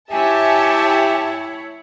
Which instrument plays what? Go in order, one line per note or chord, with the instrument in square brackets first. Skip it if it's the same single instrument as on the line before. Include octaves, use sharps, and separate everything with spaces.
[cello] E4 C#5 [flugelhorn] G4 [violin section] E5 A5 [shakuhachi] G#5